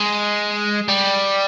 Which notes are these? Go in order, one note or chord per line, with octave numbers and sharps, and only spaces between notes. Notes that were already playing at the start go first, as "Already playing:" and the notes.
Already playing: G#3
G3